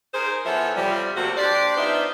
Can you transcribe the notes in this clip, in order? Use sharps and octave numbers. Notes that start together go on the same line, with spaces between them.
D#4 G#4 A#4 C5
E3 F3 B3 A4 C#5 E5
F2 C3 F3 G3
C3 F3 G3 A3 A#3 F#4
D4 G4 C5 D5
F3 B3 D4 D#4 C5 E5